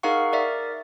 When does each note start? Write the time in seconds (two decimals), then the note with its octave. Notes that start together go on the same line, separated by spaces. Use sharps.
0.03 D#4 G#4 A#4 F5 F#5 C#6
0.33 A#4 D5 E5